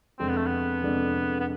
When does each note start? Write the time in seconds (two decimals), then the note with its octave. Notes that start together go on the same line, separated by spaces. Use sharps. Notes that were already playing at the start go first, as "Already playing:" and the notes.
0.19 F2 C3 G#3 C4 D4 A4
0.29 B3
0.37 A3
0.46 B3
0.82 F2 C3 G#3 D4 A4
1.40 B3